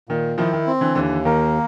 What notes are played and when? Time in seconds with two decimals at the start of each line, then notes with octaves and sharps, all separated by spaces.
0.09 A#2 D#3
0.38 D#3 F3 E4
0.53 D#3
0.67 C4
0.81 D3 E3
0.95 D#2 D3 E3
1.25 D#3 A#3